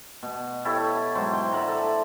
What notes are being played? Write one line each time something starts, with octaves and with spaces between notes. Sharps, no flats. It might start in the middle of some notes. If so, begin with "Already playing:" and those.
B2
E4 G4 A4 C#5
G#2 F#3 C5
G5
D5 E5 F#5 A#5
A4